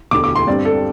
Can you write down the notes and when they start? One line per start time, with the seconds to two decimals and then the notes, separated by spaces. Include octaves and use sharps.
0.11 E1 D2 D3 D6
0.24 D6
0.36 C6
0.47 G2 G3 C4 D5
0.65 A4